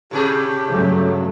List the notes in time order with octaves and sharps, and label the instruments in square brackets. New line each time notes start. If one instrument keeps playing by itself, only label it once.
[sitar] A2 C3 G#4 [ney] G4
[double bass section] G2 F#3 A3 [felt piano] C#3